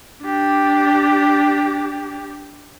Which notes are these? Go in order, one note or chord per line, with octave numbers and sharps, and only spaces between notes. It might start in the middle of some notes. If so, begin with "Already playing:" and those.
D4 G4